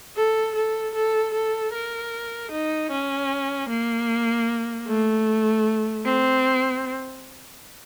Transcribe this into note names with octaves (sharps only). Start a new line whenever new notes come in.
A4
A4
A4
A4
A#4
D#4
C#4
A#3
A3
C4